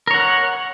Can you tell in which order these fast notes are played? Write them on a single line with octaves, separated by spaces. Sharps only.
A#4 C#5 F#5